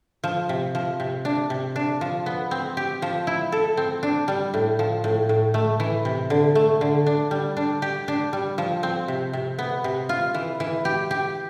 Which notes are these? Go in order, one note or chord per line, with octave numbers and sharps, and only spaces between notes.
F3
C3
F3
C3
D4
C3
D4
F3
B3
C4
G4
F3
E4
A4
C4
D4
G3
A2
F3
A2
A2
A3
E3
C3
D3
A3
D3
D4
G3
D4
G4
D4
G3
F3
C4
C3
C3
B3
C3
F4
E3
E3
G4
G4